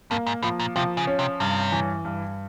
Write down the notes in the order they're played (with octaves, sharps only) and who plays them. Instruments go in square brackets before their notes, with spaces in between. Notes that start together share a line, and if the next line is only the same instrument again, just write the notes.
[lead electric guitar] G2 [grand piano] A#3
[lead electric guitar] G#2
[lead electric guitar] A2 [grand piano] F3
[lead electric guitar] A#2
[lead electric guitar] C3 [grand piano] F3
[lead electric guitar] C#3
[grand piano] C#4
[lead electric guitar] C3
[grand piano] G2 [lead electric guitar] C3
[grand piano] E3
G2